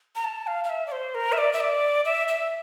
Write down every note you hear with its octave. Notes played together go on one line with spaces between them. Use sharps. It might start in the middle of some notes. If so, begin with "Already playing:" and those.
A#5
A5
F5
F5
E5
D5
C5
A#4
E5
D5
E5
D5
E5
E5